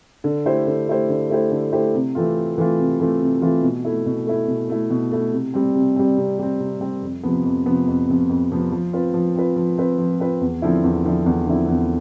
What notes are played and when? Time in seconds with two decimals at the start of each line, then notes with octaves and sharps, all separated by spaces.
0.24 D3
0.45 A3 E4 G4 C5
0.67 D3
0.88 A3 E4 G4 C5
1.09 D3
1.30 A3 E4 G4 C5
1.51 D3
1.72 A3 E4 G4 C5
1.94 C3
2.15 E3 A3 C4 F4
2.36 C3
2.58 E3 A3 C4 F4
2.79 C3
3.00 E3 A3 C4 F4
3.21 C3
3.42 E3 A3 C4 F4
3.63 B2
3.84 A3 E4
4.06 B2
4.27 A3 E4
4.48 B2
4.69 A3 E4
4.90 B2
5.12 A3 E4
5.33 C3
5.54 G3 C4
5.75 C3
5.96 G3 C4
6.17 C3
6.39 G3 C4
6.60 C3
6.80 G3 C4
7.02 F2
7.23 C3 F3 B3
7.45 F2
7.66 C3 F3 B3
7.87 F2
8.08 C3 F3 B3
8.29 F2
8.51 C3 F3 B3
8.72 F3
8.93 C4 F4 B4
9.14 F3
9.36 C4 F4 B4
9.56 F3
9.78 C4 F4 B4
9.98 F3
10.20 C4 F4 B4
10.41 E2
10.62 D3 F3 C4 E4
10.84 E2
11.04 D3 F3 C4 E4
11.26 E2
11.47 D3 F3 C4 E4
11.68 E2